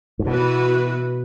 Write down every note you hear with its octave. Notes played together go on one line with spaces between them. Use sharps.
G#2
B2 E3 B3 F#4 B4